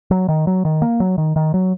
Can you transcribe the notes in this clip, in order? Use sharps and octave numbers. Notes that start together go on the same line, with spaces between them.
F#3
D#3
F#3
D#3
A#3
F#3
D#3
D#3
F#3